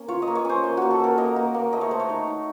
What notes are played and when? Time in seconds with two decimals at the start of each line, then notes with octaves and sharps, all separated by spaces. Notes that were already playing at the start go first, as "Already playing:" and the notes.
Already playing: A#3 C#4
0.08 F4 C#5
0.22 D#5
0.27 A#3
0.35 C#5
0.45 C#4 C5
0.64 A#3
0.77 A#3 F#4
0.91 A4
1.00 A#3 A#4
1.18 A#3 D#5
1.36 A#3
1.54 A#3
1.73 A3 D#5
1.81 C#5
1.91 A3 C5
2.00 C#5
2.09 D#4
2.27 D#4